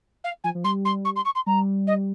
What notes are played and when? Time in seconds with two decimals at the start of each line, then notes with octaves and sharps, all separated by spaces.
0.24 F5
0.44 F3 G#5
0.55 F3
0.64 G3 C6
0.85 C6
1.05 C#6
1.16 C6
1.25 C#6
1.35 C6
1.46 G3 A#5
1.87 D#5